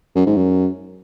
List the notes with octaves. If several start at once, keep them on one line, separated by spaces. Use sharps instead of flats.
F#2
G#2
F#2